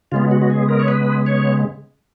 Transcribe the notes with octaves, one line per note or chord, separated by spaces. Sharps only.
C#3 G#3 B3 F4
F#4
F#4
G#4
A#4
C#5
B4
C#5